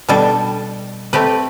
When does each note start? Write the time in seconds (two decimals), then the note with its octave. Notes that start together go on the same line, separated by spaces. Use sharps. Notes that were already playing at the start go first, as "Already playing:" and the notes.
0.09 B2 G3 D4 A4
1.13 A3 C4 G4 B4